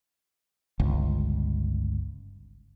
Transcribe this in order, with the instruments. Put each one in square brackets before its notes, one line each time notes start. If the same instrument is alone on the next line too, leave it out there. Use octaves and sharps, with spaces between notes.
[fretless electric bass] G1 C#2